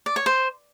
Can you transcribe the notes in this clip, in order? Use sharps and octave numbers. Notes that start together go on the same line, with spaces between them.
D5
C#5
C5